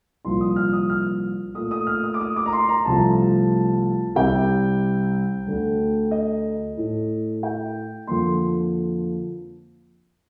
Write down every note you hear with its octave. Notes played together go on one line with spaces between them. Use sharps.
C2 A#2 F3 C6
D#6
F6
D#6
F6
A#2 A3 D#6
D#6
F6
D#6
D6
D#6
D6
A#5
C6
A#5
C2 C3 F3 A3 A5
C2 C3 G3 G5
D2 D3 A3
D#5
A2 A3
G5
F2 D3 F3 A#3 C6